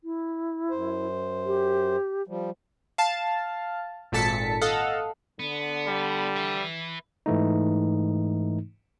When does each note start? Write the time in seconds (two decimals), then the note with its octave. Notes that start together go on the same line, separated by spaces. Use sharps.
0.04 E4
0.70 F#2 C5
1.46 G4
2.27 F3 G3
2.98 F5 A5
4.12 G#1 A#2 A4 A5 B6 C#7
4.61 A4 D#5 F5 F#5
5.40 D3 B3
5.88 G3
6.36 B4 E5
7.26 G#2 E3 A3 D#4